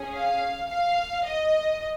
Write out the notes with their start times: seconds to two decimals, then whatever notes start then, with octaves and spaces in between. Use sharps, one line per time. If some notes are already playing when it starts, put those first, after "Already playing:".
Already playing: C#4 G#4
0.13 F5
0.69 F5
1.24 D#5